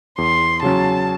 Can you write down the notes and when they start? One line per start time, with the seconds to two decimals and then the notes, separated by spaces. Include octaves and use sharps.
0.18 E2 C6
0.62 C#3 F#3 C#4 A5